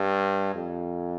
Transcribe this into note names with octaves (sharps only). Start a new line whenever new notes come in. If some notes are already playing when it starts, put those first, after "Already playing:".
Already playing: G2
F2